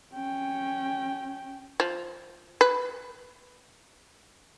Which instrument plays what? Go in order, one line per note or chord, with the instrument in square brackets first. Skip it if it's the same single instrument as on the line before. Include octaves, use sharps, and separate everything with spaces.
[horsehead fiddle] C#4 G5
[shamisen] F3
B4